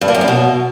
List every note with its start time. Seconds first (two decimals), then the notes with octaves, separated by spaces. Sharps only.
0.01 G2
0.08 A#3
0.15 F#2
0.21 A2
0.28 B2